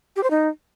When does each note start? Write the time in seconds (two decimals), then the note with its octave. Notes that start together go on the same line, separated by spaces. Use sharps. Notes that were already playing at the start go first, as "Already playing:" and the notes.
0.16 G4
0.23 C5
0.31 D#4